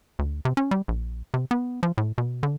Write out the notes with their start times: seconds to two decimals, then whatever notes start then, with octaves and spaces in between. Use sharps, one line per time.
0.19 D2
0.45 C3
0.57 C#4
0.71 G3
0.88 A#1
1.34 C3
1.51 B3
1.83 F3
1.98 A2
2.18 B2
2.43 D3